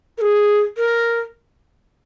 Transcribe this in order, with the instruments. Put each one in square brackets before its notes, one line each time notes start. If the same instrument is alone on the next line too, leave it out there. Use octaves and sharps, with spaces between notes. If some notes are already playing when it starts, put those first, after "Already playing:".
[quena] A#4
G#4
A#4